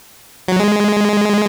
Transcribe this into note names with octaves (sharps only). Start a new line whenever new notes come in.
F#3
G#3